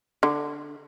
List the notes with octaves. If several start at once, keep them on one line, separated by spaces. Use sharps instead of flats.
D3